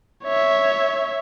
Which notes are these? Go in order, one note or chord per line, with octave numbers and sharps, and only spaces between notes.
C#5 E5